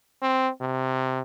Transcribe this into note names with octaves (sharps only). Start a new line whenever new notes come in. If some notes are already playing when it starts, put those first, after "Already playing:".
C4
C3